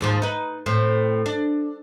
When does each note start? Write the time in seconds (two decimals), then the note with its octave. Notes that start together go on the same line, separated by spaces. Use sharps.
0.01 D#2 G#2 F3
0.22 D#4 B4
0.66 A2 C4
1.26 D4